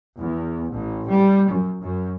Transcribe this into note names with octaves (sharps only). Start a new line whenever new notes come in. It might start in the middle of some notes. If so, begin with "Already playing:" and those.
E2
A1
G3
F#2
F#2